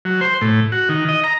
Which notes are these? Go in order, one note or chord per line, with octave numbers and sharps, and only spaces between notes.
F#3
C5
A2
F#4
D#3
D#5
A#5